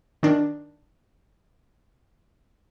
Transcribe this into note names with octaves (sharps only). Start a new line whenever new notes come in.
D#3 D4